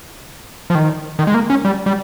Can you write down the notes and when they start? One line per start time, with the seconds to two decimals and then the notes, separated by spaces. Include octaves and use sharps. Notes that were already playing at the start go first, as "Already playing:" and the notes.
0.70 F3
0.75 D#3
1.19 D#3
1.27 G#3
1.34 A#3
1.50 C#4
1.65 G3
1.86 G3